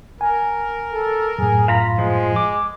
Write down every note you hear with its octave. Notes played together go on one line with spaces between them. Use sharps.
A#4 G#5
A4
F#2 A2 G#4
F4 F5 A#5 B5
F3 G#3
D6